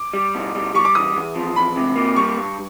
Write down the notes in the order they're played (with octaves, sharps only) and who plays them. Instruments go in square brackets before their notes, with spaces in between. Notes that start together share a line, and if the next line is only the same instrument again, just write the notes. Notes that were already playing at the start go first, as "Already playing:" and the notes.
Already playing: [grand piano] D6
[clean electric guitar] G3
B2
G3
[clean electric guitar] G3 [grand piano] C#6
[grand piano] D6
[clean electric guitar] E2 [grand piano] D#6
[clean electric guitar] E2
F3
[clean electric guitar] E2 [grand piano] B5
[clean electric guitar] C3
A#3
[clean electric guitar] G3 [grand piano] C#6
[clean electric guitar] G2